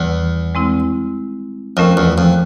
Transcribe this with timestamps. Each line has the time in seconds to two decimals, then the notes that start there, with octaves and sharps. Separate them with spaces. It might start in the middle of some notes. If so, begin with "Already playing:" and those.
Already playing: E2 D#3 G3
0.55 G#3 C4 E4
1.77 F2 A3 C#4 F4 A#4 D#5
1.97 E2
2.18 F2